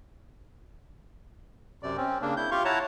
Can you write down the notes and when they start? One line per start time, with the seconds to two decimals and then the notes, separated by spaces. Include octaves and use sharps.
1.83 F#2 C3 D5
1.97 C4 C#4
2.22 C#3 A#3 D4
2.37 E4 G6
2.51 F4 G4 F5 C6 C#6
2.65 E4 C#5 F#5 A5 A#5